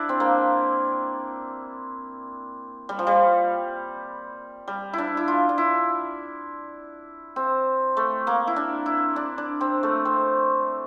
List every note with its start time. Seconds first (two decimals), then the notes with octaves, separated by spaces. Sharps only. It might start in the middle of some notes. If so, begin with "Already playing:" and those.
Already playing: D4 E4
0.09 C4
0.20 A#3
2.89 G3
2.99 F3
3.07 G3
4.68 G3
4.93 D4 E4
5.17 E4
5.28 F4
5.49 D4
5.58 E4
7.36 C4
7.97 A3
8.27 A#3
8.47 E4
8.56 D4
8.86 E4
9.16 D4
9.38 D4
9.61 C4
9.83 A3
10.05 C4